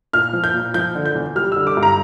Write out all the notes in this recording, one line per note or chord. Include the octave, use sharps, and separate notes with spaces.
A#2 F6
F3
G6
A#2
F3 G6
D3
G6
E2
G3 F6
D3 E6
D6
G2
A#5